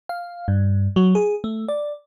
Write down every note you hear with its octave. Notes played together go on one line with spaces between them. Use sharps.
F5
G2
F#3
G#4
A3
D5